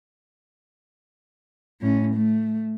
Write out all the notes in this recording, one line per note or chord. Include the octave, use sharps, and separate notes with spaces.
A2 C#4
A3